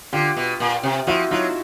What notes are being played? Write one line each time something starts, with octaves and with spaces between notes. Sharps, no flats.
D3 F4 G4
B2
A#2
C3
F3 E4 F#4
F#3 D#4 F4